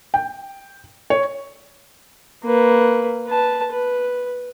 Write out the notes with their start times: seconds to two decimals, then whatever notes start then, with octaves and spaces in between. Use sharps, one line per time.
0.14 G5
1.10 C#5
2.44 A#3 B4
3.27 B4 A5
3.72 B4